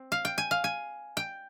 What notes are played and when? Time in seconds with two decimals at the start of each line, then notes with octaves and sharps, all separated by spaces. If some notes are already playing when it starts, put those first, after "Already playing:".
Already playing: C4
0.12 F5
0.25 G5
0.38 G#5
0.51 F5
0.64 G#5
1.17 G5